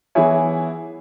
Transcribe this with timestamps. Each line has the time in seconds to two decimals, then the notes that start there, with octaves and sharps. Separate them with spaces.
0.15 E3 B3 E4 G#4 C#5